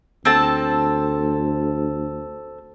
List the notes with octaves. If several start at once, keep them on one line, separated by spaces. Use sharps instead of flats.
D2 C4 A4 A5